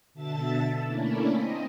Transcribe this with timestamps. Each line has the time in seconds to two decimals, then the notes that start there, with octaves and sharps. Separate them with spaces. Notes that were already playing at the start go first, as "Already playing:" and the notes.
0.14 B2 D3 E5 A5 A6
0.84 A3 A#3 C#4 D4 E4
1.34 C4 D#5